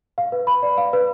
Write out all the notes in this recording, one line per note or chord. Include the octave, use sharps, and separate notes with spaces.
F5
B4
B5
D5
F5
B4